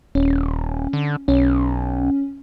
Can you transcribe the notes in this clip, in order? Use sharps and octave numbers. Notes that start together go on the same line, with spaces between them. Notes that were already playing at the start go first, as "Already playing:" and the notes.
D#1 C#4
D3
B1 C#4